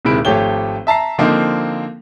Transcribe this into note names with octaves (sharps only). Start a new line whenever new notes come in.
D#1 C3 D#3 G#3 E4 D7
G#1 F3 A3 G4 C#5 G7
E5 A5 A#5 C7
D3 F3 A#3 C4 D#4